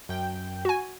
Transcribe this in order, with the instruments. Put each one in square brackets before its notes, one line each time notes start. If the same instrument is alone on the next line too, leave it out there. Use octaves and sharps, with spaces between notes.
[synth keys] F#2 G5
[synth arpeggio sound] F#4 G#5